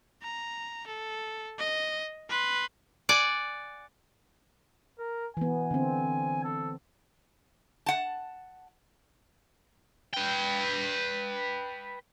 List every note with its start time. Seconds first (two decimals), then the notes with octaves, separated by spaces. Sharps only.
0.22 A#5
0.87 A4
1.58 D#5
2.29 B4 C6
3.09 D5 F#5 G#5
4.99 A#4
5.37 E3 B3 G#5
5.71 D3 C4
6.44 A4
7.86 F#5 A5
10.14 B4 G5